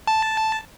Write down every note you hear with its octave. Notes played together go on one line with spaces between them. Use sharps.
A5